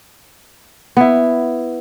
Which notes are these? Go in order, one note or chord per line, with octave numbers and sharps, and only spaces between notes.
B3 E4